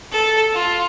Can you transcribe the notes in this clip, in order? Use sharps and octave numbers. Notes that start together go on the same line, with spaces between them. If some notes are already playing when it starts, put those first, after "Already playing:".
A4
F4